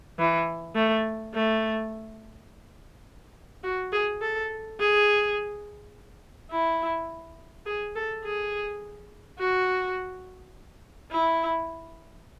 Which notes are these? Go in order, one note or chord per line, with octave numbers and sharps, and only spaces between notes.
E3
A3
A3
F#4
G#4
A4
G#4
E4
G#4
A4
G#4
F#4
E4